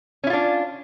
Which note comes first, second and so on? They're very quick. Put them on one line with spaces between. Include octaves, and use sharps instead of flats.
C#4 E4 F4 D4